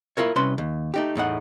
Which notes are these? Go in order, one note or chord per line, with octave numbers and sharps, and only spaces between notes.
E4 F4 A#4 C#5
C2 C#4 B4 C6
D#2
A3 D#4 G4
E2 A2 D#4 F#5